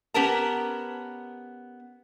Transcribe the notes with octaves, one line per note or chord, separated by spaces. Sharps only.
B3 C#4 G4 A#4 A5 A#5